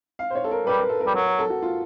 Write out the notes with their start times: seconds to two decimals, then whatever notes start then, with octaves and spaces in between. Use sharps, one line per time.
0.19 F5
0.30 C5
0.35 C#5
0.44 A4
0.51 A#4
0.67 G3 B4
0.78 A#4
0.89 A4
1.00 A#4
1.07 G3
1.14 F#3 A#4
1.27 A#4
1.39 A4
1.50 F#4
1.62 F4